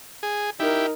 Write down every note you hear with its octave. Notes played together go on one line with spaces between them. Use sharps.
G#4
D#4 E4 G4 A#4